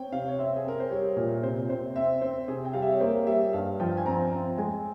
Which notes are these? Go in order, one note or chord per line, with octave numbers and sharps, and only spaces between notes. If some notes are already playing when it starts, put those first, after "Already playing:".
Already playing: C4 C#5 G5
C3 F5
C#5
C4 E5
G#4
C4 A#4
C5
G3 C#5
A#2
C3 C5
C3 C5
C4 E5
C4 C5
C3 G#4
G5
G3 F5
E5
C#5
A#3 C5
G3 E5
G2 F5
F3 G5
G#5
C4 A#5
C4
G#3 G#5